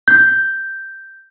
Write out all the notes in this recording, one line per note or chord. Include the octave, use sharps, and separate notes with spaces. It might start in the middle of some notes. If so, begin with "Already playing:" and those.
G6